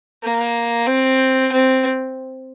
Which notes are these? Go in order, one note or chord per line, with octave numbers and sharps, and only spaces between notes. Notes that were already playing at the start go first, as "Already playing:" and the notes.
A#3
C4
C4